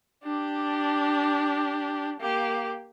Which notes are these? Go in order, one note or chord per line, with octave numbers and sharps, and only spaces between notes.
D4 G4
A#3 G4